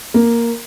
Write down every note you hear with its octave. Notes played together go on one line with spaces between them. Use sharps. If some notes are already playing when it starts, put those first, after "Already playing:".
A#3